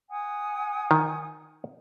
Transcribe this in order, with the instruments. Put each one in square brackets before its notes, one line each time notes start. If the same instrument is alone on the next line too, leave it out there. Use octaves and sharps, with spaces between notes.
[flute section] F#5 G#5 D#6
[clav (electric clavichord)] D#3